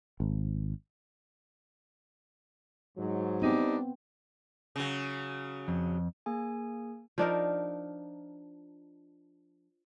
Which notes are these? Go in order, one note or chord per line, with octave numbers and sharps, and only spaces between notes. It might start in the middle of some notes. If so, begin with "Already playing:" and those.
G#1
G#2 F#3
G3 B3 C4 D4 D#4
C#3 F#3
F2
A#3 G#4 G#5
F3 D4 D#4 A#4